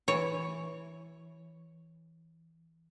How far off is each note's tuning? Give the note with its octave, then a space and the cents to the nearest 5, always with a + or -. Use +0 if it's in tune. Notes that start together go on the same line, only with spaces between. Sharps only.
E3 -5 C#5 +0